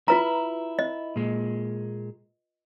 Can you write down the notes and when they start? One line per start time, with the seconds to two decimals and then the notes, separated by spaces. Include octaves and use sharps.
0.08 E4 F4 B4 A#5
0.79 D#5
1.16 A#2 G#3